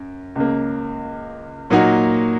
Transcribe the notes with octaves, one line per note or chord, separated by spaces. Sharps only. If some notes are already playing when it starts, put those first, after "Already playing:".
Already playing: F#2
C#2 C#3 A#3
A#2 F#3 A#3 D#4 F#4